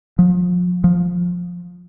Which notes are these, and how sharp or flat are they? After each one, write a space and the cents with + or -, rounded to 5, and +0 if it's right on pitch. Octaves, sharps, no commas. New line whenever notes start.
F3 +35
F3 +15